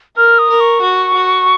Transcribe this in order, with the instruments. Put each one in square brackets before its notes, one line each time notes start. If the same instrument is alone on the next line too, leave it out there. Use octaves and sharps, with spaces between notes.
[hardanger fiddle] A#4 [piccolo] F6
[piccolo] D#6
[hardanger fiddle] A#4
[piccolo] C#6
[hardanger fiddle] F#4
F#4